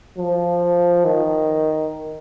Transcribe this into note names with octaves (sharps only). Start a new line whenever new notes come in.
F3
D#3